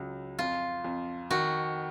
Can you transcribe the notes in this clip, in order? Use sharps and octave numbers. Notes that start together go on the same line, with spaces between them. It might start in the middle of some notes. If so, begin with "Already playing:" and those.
Already playing: C#2 F#3
F2 F4
F2
D#3 F#4